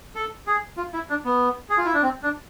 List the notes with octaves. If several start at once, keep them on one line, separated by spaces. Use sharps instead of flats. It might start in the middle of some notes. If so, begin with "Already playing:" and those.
A4
G#4
F4
E4
D4
B3
G#4
F4
E4
D4
C4
D4